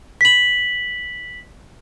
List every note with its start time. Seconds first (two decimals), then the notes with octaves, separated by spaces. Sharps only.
0.21 B6 F#7